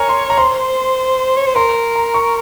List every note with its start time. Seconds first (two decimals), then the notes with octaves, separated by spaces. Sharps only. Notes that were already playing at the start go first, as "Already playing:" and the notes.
Already playing: A#4 C#5 G#5 A#5
0.09 C6
0.30 A#5
0.38 C5 C6
1.37 C#5
1.47 C5
1.56 A#4 C6
1.96 A#5
2.14 C#6